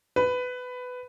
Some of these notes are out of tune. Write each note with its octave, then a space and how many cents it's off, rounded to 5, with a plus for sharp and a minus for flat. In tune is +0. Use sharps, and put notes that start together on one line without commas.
B4 +15